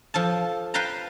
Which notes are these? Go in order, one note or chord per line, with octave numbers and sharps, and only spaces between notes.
F3 A4 A5
B4 F5 G5 A5 A#5